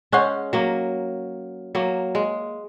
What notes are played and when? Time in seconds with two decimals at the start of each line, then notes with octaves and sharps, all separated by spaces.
0.12 G#3 C#4 C#5 F#5 C#6 F#6
0.53 F#3 A#3
1.75 F#3 A#3
2.15 G#3